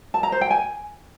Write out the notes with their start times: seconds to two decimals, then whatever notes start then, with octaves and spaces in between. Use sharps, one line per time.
0.14 A5
0.23 A#5
0.32 C5
0.41 G5
0.50 G#5